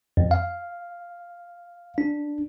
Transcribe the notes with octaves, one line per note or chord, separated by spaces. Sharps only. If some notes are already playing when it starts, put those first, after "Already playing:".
F2
F5
D4